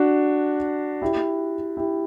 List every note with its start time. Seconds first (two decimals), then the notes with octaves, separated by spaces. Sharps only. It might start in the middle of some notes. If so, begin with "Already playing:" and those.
Already playing: D4 F#4
1.02 E4 G4
1.77 E4 G4